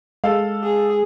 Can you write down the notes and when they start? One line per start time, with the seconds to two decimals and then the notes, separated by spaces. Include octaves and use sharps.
0.24 G#3 A4 F5
0.63 G#4